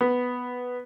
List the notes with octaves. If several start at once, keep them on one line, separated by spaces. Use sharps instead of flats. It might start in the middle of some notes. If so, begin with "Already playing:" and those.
B3